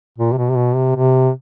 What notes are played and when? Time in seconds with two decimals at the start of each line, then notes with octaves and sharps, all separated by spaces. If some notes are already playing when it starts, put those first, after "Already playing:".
0.18 A#2
0.33 C3
0.38 B2
0.50 C3
0.56 B2
0.75 C3
0.95 C3